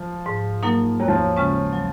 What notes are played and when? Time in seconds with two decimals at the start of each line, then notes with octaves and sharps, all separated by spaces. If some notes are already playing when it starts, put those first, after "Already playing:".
Already playing: F3
0.26 G#2
0.63 F#3 A#3 D#4 A#4
1.00 D#2 F#3
1.08 F3
1.17 F#3
1.37 C#3 G#3 C#4
1.73 F#3